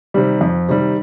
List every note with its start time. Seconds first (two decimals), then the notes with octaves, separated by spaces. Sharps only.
0.14 C3 D#3 G3
0.41 F2
0.69 C3 D#3 G3